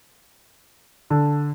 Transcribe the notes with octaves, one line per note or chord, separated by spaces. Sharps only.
D3